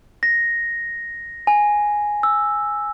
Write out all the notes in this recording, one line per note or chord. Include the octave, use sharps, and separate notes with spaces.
A#6
G#5
E6